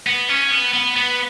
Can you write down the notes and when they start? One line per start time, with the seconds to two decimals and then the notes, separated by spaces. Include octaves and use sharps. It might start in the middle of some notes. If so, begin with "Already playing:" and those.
0.07 B3
0.29 C#4
0.51 B3
0.74 B3
0.96 B3